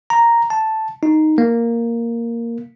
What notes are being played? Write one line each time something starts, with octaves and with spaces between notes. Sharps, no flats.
A#5
A5
D#4
A#3